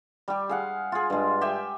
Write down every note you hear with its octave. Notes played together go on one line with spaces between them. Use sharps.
G3 G4
G#4 F5 F#5
F4 G#4
G2 G#3
G4 E5 G5 G#5